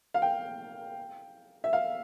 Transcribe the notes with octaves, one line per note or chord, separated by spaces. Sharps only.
F5
G5
E5
F5